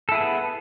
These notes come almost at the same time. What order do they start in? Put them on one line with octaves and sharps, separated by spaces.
A4 E4 G#4 B3